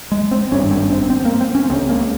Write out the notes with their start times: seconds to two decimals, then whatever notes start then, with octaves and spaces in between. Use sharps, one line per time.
0.12 G#3
0.31 C4
0.51 G#1 G2 C#4
0.71 C4
0.91 C4
1.10 C4
1.25 A#3
1.41 C4
1.55 C#4
1.70 C#2 C#3 C4
1.89 A#3